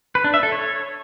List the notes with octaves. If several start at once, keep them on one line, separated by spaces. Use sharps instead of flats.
B4
D4
E5
A4
C#5